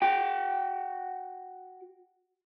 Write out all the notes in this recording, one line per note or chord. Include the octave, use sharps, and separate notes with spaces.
F#4 G5